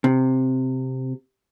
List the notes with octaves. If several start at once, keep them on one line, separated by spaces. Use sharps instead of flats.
C3